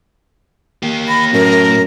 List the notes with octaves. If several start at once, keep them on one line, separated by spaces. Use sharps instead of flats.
A#3 G4
B5 A#6
F#2 A2 A#4